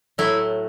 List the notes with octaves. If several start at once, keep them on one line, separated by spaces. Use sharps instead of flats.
A2 F#3 A3 E4